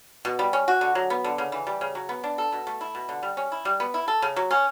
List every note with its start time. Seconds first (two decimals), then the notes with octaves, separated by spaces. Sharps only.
0.25 B2
0.39 G3
0.53 C#4
0.68 F#4
0.81 D3
0.95 F#3
1.10 B3
1.24 D3
1.38 C#3
1.52 E3
1.67 G3
1.81 C#3
1.95 F#3
2.09 B3
2.24 D4
2.38 A4
2.52 B2
2.67 A3
2.81 E4
2.95 B2
3.09 D3
3.23 G3
3.37 C#4
3.52 E4
3.65 G3
3.80 B3
3.94 E4
4.08 A4
4.22 C#3
4.36 F#3
4.51 C#4